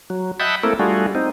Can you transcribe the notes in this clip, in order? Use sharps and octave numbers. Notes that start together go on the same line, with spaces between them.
F#3
D#5 E5 F#5 G5 A5 B5
A3 A#3 C4 E4 A4 A#4
G3 A3 D4 F4 F#4 G#4
C4 D#4